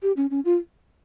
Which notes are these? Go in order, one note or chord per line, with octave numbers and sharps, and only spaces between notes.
G4
C#4
C#4
F4